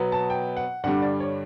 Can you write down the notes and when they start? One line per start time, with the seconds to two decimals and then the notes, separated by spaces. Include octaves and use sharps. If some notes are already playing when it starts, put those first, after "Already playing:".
Already playing: B2 F#3 B3
0.12 A5
0.30 G5
0.57 F#5
0.84 G2 D3 G3 F#5
1.02 D5
1.20 C#5